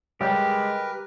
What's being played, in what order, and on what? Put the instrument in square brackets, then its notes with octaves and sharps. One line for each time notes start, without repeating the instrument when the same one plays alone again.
[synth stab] C#3 G3 [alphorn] G#3 [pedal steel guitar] G4 [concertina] A#4 B4